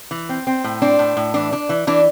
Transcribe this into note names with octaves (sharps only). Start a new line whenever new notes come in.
E3
C4
C4
A2
C4 D4
A2
A2
E3 D4
D4
E3
E3 D4